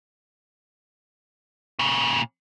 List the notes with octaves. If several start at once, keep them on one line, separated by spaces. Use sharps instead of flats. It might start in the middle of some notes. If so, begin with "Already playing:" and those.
A#2 C#3